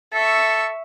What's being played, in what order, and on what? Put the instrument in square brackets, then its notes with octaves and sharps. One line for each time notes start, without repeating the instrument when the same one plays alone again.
[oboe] A4 [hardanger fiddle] E5 C#6